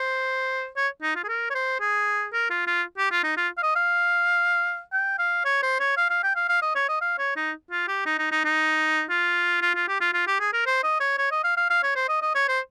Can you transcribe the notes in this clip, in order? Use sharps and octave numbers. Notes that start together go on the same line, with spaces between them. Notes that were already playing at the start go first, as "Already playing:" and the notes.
Already playing: C5
C#5
D#4
F4
G#4
A#4
C#5
C5
G#4
A#4
F4
F4
G4
F4
D#4
F4
F5
D#5
F5
G5
F5
C#5
C5
C#5
F5
F5
G5
F5
F5
D#5
C#5
D#5
F5
C#5
D#4
F4
G4
D#4
D#4
D#4
D#4
F4
F4
F4
G4
F4
F4
G4
G#4
A#4
C5
D#5
C#5
C#5
D#5
F5
F5
F5
C#5
C5
D#5
D#5
C#5
C5